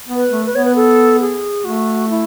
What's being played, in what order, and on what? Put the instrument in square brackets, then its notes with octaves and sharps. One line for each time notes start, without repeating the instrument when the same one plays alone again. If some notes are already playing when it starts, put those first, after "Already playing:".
[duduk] B3
[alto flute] B4
[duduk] A3
[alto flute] B4
[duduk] B3 [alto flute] C#5
[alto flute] B4
A4
G#4
[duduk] A3 [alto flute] F#4
[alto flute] E4